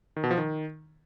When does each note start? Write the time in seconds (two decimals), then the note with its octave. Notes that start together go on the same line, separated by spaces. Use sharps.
0.16 D#3
0.24 B2
0.31 F3
0.38 D#3